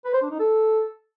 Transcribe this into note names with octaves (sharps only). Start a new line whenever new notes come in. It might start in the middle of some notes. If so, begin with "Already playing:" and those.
B4
C5
D4
D#4
A4